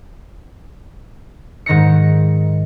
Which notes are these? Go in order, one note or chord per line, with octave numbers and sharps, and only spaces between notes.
G#2 D#3 A#6 C#7